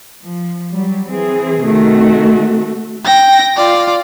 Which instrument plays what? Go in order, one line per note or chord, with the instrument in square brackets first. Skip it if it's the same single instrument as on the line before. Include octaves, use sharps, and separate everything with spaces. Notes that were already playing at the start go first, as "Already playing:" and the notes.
[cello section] F3
F#3 G3
E3 C4 G#4
[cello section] C3 D#3 [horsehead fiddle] A3 F#4
[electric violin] G5 A#6
F4 D5